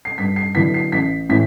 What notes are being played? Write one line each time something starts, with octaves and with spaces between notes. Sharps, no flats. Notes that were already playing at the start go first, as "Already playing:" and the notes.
C7
G2 B6
C7
D3 F#3 B3 E4 B6
C7
A1 B6
A2 E3 B6